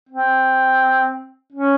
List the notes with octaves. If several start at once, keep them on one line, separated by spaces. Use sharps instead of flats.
C4
C#4